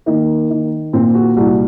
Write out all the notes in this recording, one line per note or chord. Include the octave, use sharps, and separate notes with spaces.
D#3 A#3
D#3
A#2 C4
F#4
C2 F#4